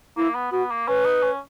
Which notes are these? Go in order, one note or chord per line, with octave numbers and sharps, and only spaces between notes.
A#3 E4
B3
B3 F#4
A#3
C#4 B4
D#4
C#4